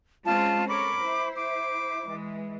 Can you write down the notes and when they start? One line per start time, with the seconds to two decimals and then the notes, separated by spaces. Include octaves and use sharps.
0.25 G#3 C4 C#4 F4 A5
0.68 A4 A#4 C#5 B5 D6
1.02 E4 C5
1.37 D6
2.08 E3 G#3